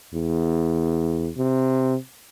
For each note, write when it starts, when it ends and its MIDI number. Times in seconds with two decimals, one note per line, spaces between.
0.14 1.29 40
1.37 1.95 48